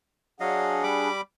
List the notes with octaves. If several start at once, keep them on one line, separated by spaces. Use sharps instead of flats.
F#3 D4 G#4 D#5 F5 F#5
G3 B5 D6